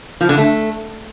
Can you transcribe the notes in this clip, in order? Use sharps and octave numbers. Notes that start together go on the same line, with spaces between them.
F3
D3
A3